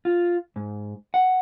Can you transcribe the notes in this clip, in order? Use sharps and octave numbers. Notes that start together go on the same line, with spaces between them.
F4
G#2
F#5